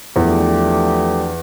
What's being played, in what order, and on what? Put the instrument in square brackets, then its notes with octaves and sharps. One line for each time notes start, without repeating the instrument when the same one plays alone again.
[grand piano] E2 [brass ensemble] F3 A3 D4 G4